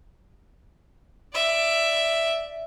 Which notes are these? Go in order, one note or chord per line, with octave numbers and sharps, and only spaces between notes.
D5 E5